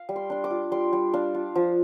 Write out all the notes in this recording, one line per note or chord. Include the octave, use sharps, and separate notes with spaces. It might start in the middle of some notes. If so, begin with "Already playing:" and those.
Already playing: F5
G3
C6
D4 C6
D6
F4
G3 C6
G3
D4 F5
F4
F3